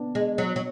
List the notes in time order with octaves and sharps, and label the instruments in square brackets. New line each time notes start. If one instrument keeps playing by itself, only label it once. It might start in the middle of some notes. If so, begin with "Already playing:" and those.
Already playing: [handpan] B3 D4
[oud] G#3
F#3
F#3